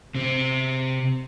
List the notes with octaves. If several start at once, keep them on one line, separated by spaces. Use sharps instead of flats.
C3 C4